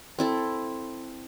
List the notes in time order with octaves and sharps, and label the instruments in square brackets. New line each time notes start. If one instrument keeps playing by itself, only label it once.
[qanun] C4 E4 A4